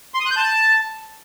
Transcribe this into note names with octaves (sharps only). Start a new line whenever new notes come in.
C6
D#6
F#6
G6
A5